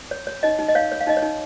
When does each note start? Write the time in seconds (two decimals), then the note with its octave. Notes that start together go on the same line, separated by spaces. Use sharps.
0.11 C#5
0.27 C#5
0.43 D#4 D#5
0.59 D#4
0.68 D#5
0.75 C#5 F5
0.92 C#5
1.01 F5
1.07 D#4 D#5
1.17 C#5
1.22 D#4